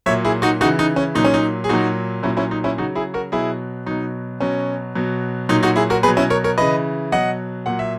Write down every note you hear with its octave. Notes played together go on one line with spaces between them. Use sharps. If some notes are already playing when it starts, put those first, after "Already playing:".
A#2 F#3 C#5 E5
E4 G#4
D#4 F#4
C#3 E3 D#4 F#4
D#4
C#4
A#2 F#3 D#4
C#4
D#4
G#4
A#2 F#3 D#4 F#4
A#2 F#3 C#4 E4
C#4 E4
D#4
C#4 E4
C#3 F#3 D#4 F#4
E4 G#4
F#4 A#4
B2 F#3 E4 G#4
B2 F#3 D#4
B2 F#3 C#4
B2 F#3
A#2 F#3 D#4
D#4 F#4
E4 G#4
F#4 A#4
B2 F#3 G#4 B4
C#4 E4
A#4 C#5
A#4 C#5
C#3 E3 B4 D#5
B2 F#3 D#5 F#5
A#2 F#3 F#5
E5